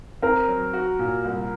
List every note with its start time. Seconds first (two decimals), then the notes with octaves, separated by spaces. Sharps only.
0.22 C4 A#4
0.48 F#3
0.73 F#4
0.99 A#2
1.24 C2